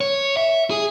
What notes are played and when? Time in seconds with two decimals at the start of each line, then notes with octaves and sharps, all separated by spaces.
0.01 C#5
0.37 E5
0.70 G#4